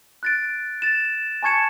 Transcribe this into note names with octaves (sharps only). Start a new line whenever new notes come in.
F#6 A6 D7
A6 E7
G#5 A5 C#6 G#6 C#7 E7